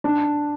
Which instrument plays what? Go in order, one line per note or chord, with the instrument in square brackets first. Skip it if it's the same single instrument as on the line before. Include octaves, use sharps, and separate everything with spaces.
[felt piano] D4